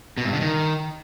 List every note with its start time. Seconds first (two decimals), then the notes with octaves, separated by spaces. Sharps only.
0.17 B2
0.25 G2
0.33 D3
0.41 D#3